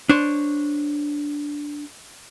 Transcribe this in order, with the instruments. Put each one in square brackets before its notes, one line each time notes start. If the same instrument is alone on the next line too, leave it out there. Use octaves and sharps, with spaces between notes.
[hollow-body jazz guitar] D4 C5 C#5